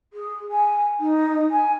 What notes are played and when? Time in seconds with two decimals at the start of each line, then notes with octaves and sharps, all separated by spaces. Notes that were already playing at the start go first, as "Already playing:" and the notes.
0.13 G#4
0.50 G#5
1.00 D#4
1.51 G#5